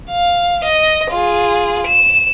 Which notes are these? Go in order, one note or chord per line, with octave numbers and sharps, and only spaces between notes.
F5
D#5
F4 G#4
E7